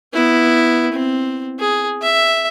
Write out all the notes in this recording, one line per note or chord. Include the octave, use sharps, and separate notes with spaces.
B3 E4
C4
G#4
E5